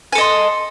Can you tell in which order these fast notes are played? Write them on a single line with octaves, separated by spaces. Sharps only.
G#5 A4 D#5 C6